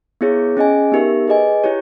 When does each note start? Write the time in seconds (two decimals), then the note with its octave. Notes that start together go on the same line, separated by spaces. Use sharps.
0.21 B3 E4 G#4 C#5
0.57 C#4 G#4 D#5 G#5
0.92 B3 D#4 G4 A#4 E5
1.28 G#4 B4 D#5 G#5
1.64 E4 G4 C#5